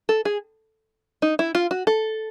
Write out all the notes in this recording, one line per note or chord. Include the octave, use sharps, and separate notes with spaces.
A4
G#4
D#4
E4
F4
F#4
A4